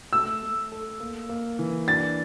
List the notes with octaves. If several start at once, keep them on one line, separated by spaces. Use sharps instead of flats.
A3 E6
A3
A4
A#3
A#3
E3
D4 A6